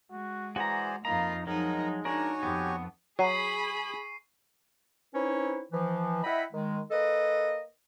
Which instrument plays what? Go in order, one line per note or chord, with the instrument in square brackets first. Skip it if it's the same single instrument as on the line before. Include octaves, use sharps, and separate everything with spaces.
[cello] G#3 [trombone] F#4
[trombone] E3 [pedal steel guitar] F#4 A#5 [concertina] G#4 C5 D5
[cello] F2 F4 [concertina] A#3 D#5 B5 [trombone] D#4 [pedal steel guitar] A#5
[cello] F3 D#4 [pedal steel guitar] F#3 [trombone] G#3 [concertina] A#4
[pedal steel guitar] D4 A#4 [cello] D#4 [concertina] F#4 C#5 G#5
[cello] F2 [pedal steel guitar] B3 [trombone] G4
[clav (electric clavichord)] F#3 [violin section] G#4 B5 [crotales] C#6 C7 D#7
[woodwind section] C4 C#4 D#4 E4 B4 C#5
E3 F3
E4 D#5 E5 F#5 G5 B5
D#3 G#3
A#3 A4 B4 D#5